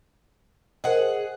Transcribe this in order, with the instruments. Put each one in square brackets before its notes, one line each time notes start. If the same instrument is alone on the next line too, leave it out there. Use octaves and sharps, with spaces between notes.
[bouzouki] G#4 F#5 [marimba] A#4 C5 D#5